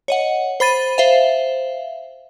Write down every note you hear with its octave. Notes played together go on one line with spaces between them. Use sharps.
C#5 D#5 F#5
C5 B5 A6 D#7
C5 E5 F5